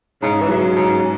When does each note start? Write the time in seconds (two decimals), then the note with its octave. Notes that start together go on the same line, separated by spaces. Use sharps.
0.22 G#2 C#3
0.41 E3
0.49 C#3 F#3
0.76 G#2 C#3